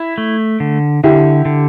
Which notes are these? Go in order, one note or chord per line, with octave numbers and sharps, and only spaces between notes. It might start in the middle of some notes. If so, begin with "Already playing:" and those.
Already playing: E4
A3
D3
D3 E4 G4
D3